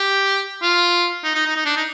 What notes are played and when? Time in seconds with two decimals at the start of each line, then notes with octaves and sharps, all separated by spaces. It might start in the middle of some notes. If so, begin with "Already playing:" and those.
Already playing: G4
0.62 F4
1.24 D#4
1.35 D#4
1.46 D#4
1.56 D#4
1.66 D4
1.77 D#4